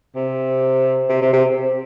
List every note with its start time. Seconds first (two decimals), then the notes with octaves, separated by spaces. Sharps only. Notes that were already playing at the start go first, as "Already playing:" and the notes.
0.16 C3
1.09 C3
1.21 C3
1.33 C3